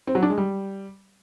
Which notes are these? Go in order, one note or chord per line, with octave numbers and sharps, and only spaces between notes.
C4
F#3
D4
G#3
G3